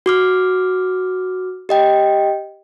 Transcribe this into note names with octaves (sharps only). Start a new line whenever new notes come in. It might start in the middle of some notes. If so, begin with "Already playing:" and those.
F#4 D6 F6
G4 D#5 G5